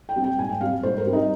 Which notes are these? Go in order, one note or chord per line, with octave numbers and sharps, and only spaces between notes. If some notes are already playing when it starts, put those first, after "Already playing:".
G5
G3 C4
G5
G#2 G#5
G5
G3 C4 F5
G#2 C5
A#4
G3 C4
D#4